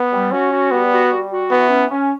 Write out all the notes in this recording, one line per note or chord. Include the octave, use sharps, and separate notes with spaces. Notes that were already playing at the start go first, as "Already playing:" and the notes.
Already playing: B3
G3
C#4 F#4
F#4
G3 B3
F#4
G3
F#4
E3 B3
C#4
C#4